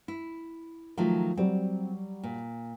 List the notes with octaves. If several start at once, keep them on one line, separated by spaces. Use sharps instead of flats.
E4
D#3 F3 F#3 A3
F#3 G3 C4
A#2